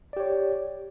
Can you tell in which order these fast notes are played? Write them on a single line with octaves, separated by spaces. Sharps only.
D5 G4 C#5